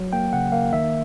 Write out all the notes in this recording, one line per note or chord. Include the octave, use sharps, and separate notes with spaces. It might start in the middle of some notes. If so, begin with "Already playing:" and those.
Already playing: F#3
A#3 G5
C#3 F#5
A#3 F5
D#3 E5